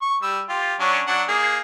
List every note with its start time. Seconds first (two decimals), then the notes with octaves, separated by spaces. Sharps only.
0.02 C#6
0.22 G3 E6
0.49 F4 G4
0.80 F#3 C#4 D4
1.07 F#3 D4 F#5
1.29 A#3 D#4 G#4